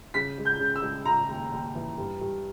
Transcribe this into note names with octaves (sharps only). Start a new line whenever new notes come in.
C#3 B6
G#3
G6
C#3
E6
G#3
C#3 A#5
D#2
D#2
E3
G2
G2